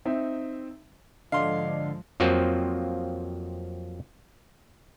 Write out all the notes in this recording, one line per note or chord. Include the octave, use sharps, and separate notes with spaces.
C4 D#4 E5
G#2 D3 F3 D5 D#5 F5 C6
F2 F3 F#3 A#3 C4